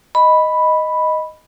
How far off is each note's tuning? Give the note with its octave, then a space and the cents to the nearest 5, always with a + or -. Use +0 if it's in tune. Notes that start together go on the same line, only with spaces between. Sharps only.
D#5 +0 B5 +0